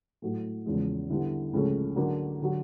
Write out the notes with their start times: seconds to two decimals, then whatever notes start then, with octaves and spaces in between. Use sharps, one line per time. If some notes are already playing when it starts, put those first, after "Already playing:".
0.22 A2 F#3 A3
0.66 E2 C#3 F3 G#3
1.09 D3 G3 B3 E4
1.53 C#2 C#3 F3 A3 C#4
1.96 D3 F#3 A#3 D4
2.42 D3 F#3